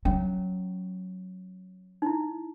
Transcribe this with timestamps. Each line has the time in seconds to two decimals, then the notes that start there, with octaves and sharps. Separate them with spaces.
0.05 F#3 C#4
2.02 D#4 E4